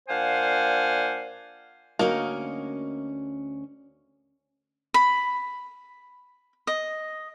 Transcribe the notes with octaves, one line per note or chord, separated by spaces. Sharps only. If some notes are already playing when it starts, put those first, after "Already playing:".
A#2 D4 C5 F5 F#5 G#5
D2 A#3 C#4 D#4 F#4 A#4 D#5
B5
D#5